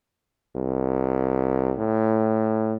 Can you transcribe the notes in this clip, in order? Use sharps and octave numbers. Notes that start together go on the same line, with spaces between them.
C2
A2